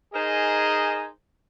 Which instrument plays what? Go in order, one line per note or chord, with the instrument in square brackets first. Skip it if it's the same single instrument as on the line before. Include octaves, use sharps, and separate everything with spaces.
[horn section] D#4 G#4 A#4 C5 D#5 G#5